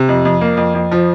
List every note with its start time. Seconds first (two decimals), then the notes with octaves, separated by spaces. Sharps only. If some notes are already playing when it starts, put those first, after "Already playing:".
Already playing: C3
0.09 F2
0.25 F2
0.41 A#3
0.57 F2
0.75 F2
0.92 F3